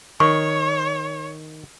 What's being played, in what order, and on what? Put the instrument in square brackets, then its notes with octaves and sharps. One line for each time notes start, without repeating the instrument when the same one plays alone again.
[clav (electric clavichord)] D#3 [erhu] C#5 [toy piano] C#6